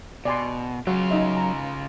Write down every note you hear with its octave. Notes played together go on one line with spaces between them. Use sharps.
B2 D5 G#5 C6
C#3 F#3 F4
D#4 D#5 E5
A#5